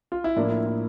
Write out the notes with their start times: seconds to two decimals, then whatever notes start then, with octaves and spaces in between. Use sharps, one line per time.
0.12 F4
0.24 E4
0.36 A2 F3 A#3 D4
0.51 E4
0.67 E4